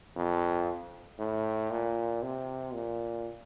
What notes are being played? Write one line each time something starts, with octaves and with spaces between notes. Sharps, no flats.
F2
A2
A#2
C3
A#2